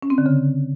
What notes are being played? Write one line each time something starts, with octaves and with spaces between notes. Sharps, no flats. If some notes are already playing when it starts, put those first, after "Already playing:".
C#4
C4
D3
C#3